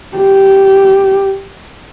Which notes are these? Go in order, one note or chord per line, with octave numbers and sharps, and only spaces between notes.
G4